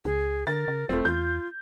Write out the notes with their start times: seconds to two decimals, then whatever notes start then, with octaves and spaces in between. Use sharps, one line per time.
0.05 C#2 G#4
0.47 D3 A#4 A6
0.68 C#3
0.89 E1 A3 C4 F4
1.05 E2 F4 G6